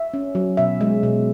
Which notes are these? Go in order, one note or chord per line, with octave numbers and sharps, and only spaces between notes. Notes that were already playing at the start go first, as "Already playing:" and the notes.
Already playing: E5
C#4
F#3
B2 E5
G#3
B2